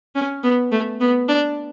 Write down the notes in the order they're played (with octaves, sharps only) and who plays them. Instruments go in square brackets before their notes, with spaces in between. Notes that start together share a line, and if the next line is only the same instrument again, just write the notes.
[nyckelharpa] C#4
B3
A3
B3
D4